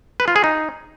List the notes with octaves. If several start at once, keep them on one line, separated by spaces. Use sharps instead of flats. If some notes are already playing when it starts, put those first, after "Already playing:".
B4
F4
G#4
D#4